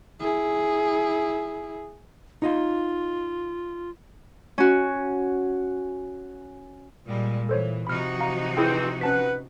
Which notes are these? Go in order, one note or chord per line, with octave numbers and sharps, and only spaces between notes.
E4 G#4
D#4 F4 D#5 F5
C#4 F#4
A#2 G3 G#3
E3 A4 C5 C#5
C3 F3 D#4 F#4 B5 F6
F5 A#5
E3 C4 E4 G#4 G5
C#4 B4 F#5 A5 B6